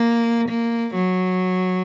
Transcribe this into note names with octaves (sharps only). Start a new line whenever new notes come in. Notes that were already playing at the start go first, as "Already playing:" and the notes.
Already playing: A#3
A#3
F#3